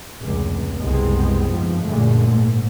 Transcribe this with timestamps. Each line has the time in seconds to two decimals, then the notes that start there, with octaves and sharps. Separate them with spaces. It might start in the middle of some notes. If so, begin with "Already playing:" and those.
0.21 F1 C#2 A2
0.78 F#1 C2 G#3 B3 C4
1.52 G#2 F3
1.85 A1 F#2 A#2 D3 G#3 A3
2.29 G#2